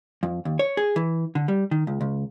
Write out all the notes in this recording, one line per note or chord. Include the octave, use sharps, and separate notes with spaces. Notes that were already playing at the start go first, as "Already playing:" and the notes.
F2
D#2
C#5
G#4
E3
D3
G3
D#3
C#2
C#2